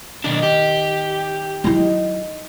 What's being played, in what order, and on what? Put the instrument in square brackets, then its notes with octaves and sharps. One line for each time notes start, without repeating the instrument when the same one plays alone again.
[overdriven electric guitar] B1 D4 [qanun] D#3
[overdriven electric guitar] G4
[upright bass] F#3 E4 [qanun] D#4 A#5 C6